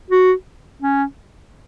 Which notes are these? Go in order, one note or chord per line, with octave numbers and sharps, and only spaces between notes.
F#4
C#4